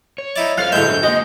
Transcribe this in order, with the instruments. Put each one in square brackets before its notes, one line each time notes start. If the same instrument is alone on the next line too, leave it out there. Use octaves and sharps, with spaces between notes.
[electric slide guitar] C#5
[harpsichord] D#4 E4 D5
[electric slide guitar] F#3 A4 C5 [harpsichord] F4 [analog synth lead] F5
[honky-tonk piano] G1 A2 G#3 [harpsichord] C#5 E5 [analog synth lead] G6
[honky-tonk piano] D3
[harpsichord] G#3 [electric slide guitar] A#3 F#4 [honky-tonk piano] D#5